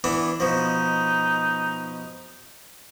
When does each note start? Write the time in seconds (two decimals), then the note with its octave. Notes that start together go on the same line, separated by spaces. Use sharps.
0.04 E3 B3 D4
0.40 B2 F3 D#4